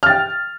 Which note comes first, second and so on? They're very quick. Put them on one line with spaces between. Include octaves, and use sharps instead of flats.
F6 A6 G5